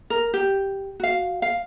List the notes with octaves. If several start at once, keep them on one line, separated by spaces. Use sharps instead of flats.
A#4
G4
F#4 F5
F5